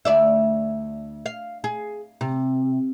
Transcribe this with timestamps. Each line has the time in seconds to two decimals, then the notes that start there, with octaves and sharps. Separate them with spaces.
0.05 D2 D5 E5
1.26 F5
1.64 G#4
2.21 C3